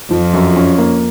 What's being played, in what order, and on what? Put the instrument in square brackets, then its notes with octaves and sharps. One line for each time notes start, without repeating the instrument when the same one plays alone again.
[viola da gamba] F2 [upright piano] F3
[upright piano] F#2
C#4
A#3